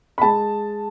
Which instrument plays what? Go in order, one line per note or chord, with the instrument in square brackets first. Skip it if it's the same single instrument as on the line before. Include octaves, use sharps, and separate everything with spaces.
[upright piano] B5
G#3 A5